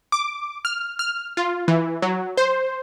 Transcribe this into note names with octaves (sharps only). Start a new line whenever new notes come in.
D6
F6
F6
F4
E3
F#3
C5